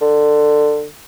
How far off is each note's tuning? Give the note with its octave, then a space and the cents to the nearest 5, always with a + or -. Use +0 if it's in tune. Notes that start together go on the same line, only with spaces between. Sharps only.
D3 +20